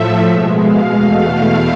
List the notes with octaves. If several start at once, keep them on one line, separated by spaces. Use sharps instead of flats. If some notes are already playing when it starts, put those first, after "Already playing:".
Already playing: A2 F3 A3 E5
B2 G#3
F5
E2 B2 A3 F5